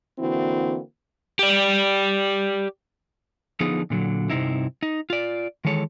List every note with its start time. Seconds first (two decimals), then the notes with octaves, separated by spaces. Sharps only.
0.19 D3 E3 A#3 C4 E4 F#4
1.39 G4 D5
3.60 D3 F3 B3 D#4 F4 G#4
3.90 A#2 D3 F#3
4.30 G2 C3 C4 D#4 E4
4.83 D#4
5.10 F4 D5
5.65 D#3 E3 G#3 A4 C#5